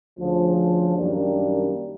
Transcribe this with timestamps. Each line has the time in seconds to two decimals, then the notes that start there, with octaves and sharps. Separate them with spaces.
0.18 D2 C#3 F3
0.95 F#2 D#3 G3 A#3 D4